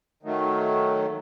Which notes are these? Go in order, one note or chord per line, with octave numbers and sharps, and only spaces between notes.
D#3 F#3 A3